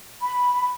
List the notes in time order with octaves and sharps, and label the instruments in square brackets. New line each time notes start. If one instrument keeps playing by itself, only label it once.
[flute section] B5